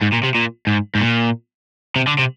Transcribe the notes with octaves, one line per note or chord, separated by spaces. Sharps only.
G#2
A#2
C3
A#2
G#2
G#2
A#2
C3
D3
C3